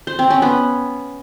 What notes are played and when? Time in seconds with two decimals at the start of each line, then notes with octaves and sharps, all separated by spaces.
0.07 C5
0.19 C4
0.30 C#4
0.42 B3